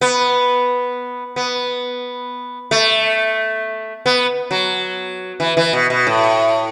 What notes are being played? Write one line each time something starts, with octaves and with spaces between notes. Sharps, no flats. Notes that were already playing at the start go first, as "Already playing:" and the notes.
B3
B3
A3
B3
F#3
E3
E3
B2
B2
A2